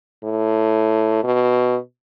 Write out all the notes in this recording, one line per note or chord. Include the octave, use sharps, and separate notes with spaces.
A2
B2